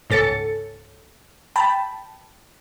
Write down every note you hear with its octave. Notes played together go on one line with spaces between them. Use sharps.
C#2 G#2 A4 A6 C#7
G5 A5 B5